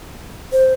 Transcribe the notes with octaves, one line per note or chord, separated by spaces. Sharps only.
C5